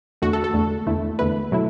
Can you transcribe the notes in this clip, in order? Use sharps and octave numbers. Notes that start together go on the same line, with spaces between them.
E2 D3 A3 F#4
A4
A4
E2 D3 A3
E2 D3 A3 E4
E2 D3 A3 E4 B4
B2 F#3 A3 E4